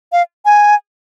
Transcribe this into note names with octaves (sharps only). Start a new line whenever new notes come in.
F5
G#5